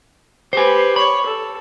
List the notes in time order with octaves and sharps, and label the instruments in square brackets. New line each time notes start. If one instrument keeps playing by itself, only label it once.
[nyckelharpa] G4 B4 [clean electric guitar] C5 G#5
[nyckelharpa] C#5 [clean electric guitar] B5
[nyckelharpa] A4